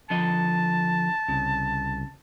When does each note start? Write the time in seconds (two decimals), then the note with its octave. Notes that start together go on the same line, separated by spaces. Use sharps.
0.10 D3 F3 D#5 A5
1.28 C2 C#3